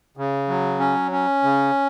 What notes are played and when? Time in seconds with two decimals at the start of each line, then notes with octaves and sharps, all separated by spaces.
0.17 C#3
0.48 F#3
0.80 C#4
1.12 C#4
1.43 C#3